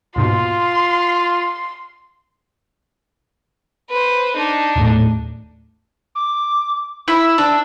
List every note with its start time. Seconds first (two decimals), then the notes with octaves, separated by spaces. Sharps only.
0.16 D#2 G#2 B2 F4 C6
3.89 B4 C5
4.36 D4 D#4
4.76 D#1 A2
6.15 D6
7.08 E4 B5 E6
7.38 D4